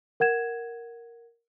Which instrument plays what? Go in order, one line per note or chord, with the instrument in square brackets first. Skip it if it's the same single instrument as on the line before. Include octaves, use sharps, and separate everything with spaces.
[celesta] A#4 F#5 G#6 E7